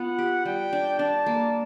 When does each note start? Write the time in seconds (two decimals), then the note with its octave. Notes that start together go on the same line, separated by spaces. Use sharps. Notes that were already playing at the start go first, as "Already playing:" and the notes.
Already playing: B3 F4 F#5
0.19 G4
0.45 G3 G5
0.73 D4
0.99 D4 A5
1.26 A#3